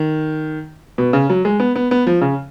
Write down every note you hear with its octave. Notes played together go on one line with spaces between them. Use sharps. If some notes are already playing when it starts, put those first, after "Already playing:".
Already playing: D#3
B2
C#3
F#3
G#3
B3
B3
B3
F3
C#3